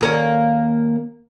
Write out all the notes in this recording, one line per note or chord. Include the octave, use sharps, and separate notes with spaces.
D#2 A#3 C#4